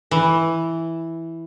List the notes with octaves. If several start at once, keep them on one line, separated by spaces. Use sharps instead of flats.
E3